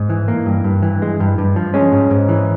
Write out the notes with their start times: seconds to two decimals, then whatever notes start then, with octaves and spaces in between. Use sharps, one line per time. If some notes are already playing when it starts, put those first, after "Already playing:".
Already playing: G#2
0.10 E3
0.28 A#3
0.46 G2
0.64 G2
0.83 E3
1.02 G#3
1.20 G2
1.38 G2
1.56 F3
1.74 G#3 C#4
1.92 G#2
2.10 G#2
2.29 E3